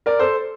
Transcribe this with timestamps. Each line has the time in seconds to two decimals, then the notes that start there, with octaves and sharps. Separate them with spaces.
0.06 A#4 D5
0.19 A4 C5